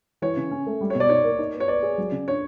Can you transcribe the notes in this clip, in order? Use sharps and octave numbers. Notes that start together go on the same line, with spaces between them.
E3 C#5
C#3
C#4
A3
G3
B2 C#5
D5
D#4 C#5
A#3
D#4
B3
C#5
B4 D5
G#4
F#3
C#3
D4 C#5